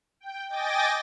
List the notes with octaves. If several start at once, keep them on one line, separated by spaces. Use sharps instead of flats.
G5
D#5 G5 G#5 D6 A6 A#6